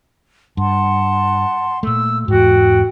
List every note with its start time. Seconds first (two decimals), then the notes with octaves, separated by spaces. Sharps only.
0.57 G2 F#5 A5 C6
1.83 A#2 A3 E6
2.28 E2 G#2 F#4 G5